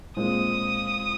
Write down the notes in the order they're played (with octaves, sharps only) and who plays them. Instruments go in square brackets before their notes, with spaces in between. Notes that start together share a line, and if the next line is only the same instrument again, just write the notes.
[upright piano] A#2 G#3 C4 [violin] D#6